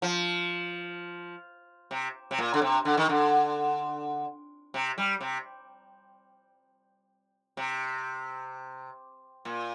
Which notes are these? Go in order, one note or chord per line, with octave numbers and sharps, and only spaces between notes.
F3
C3
C3
A#2
D3
C3
D3
D#3
D3
C3
G3
C3
C3
A#2